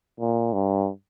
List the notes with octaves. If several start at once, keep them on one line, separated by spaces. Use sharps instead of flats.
A#2
G2